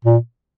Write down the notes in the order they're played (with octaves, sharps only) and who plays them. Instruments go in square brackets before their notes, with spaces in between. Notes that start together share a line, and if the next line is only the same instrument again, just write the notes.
[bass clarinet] A#2